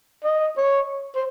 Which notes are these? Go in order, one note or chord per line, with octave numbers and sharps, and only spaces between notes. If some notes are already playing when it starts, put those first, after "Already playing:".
D#5
C#5
C5